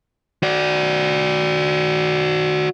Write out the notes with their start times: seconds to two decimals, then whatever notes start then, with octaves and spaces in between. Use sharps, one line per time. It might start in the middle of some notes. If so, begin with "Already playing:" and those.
0.43 F#4 D5